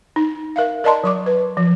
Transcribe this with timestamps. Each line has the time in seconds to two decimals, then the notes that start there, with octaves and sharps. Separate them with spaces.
0.16 D#4
0.56 A#4 E5 F5
0.84 A#4 D5 D#5 A5 A#5 C6
1.04 F#3 C#6 D6
1.26 B4
1.57 F3